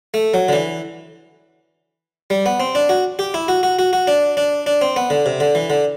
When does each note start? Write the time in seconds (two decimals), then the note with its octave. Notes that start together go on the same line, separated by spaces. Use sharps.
0.14 A3
0.34 F#3
0.48 D3
0.53 E3
2.30 G3
2.46 B3
2.60 C4
2.75 D4
2.89 F#4
3.19 G4
3.34 E4
3.48 F#4
3.63 F#4
3.79 F#4
3.93 F#4
4.07 D4
4.37 D4
4.67 D4
4.81 C4
4.96 B3
5.10 D3
5.26 C3
5.40 D3
5.55 E3
5.70 D3